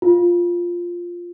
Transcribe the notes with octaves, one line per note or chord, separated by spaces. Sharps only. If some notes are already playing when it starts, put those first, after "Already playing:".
F4